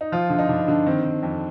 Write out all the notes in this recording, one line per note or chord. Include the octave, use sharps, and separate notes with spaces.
D#4
F3 F4
D3
D#4
G2 D3 D4
D3
D#3 C4
D#3
F2